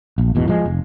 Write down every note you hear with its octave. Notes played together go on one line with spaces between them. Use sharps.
A#1
G#1 E2 B2
F3 G#3
F1